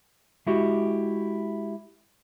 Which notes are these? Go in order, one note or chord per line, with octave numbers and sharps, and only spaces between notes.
G#3 E4 F#4 G4